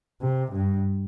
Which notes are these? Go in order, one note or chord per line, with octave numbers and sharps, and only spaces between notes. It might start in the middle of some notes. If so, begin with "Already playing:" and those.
C3
G2